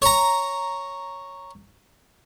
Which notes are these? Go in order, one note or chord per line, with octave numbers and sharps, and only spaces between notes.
C#5 A#5